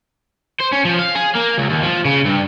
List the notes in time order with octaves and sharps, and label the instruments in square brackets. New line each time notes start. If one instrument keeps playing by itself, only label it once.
[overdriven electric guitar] C5
C#4
F3
F5
G#4
A#3
C#2
D#2
F3
C#3
G2